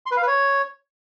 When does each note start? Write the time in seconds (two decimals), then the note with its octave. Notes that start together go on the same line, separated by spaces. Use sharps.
0.06 C6
0.11 B4
0.17 F5
0.22 B4
0.27 C#5